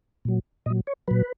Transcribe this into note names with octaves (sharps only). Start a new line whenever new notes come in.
A#2 F#3
A#2 F#3 D#5
C#5
A#2 F#3 B4